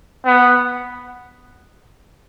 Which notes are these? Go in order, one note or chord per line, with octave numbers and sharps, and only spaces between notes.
B3